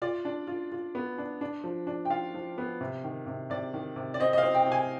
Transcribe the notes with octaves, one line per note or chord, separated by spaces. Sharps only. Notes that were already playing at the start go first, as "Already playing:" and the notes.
F4 D5
D4
F4
F4
B3
D4
D4
F3
D4
G5
F4 F5
F3
B3
C3
D#3
C3
C3 D5
D#3
C3
D5
C4 D#5
D#5
C4 F5
G5
C3
G#5